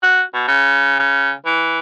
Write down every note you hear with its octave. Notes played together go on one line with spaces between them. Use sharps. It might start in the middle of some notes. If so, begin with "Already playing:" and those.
F#4
B2
C#3
C#3
E3